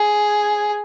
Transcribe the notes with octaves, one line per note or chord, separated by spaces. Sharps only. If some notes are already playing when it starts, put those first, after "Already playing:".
Already playing: G#4